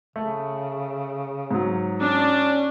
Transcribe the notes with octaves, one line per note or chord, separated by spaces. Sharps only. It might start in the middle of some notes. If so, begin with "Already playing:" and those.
C#3 A3
G#2 F#3
C#4 D4